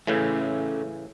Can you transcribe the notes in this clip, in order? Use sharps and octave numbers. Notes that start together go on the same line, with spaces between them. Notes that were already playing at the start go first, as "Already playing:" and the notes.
A2 C#3 E3 A3 C#4